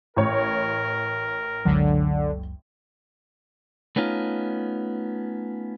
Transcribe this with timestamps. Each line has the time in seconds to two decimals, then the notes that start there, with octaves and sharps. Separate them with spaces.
0.16 A1 A#4 C#5
1.65 F#1 C#2 D3 F#3
3.96 A3 B3 C#4 D#4 F4